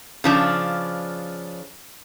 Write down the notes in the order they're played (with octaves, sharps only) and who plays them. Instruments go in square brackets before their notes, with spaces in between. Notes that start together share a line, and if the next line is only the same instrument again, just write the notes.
[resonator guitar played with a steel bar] C#3 F3 D4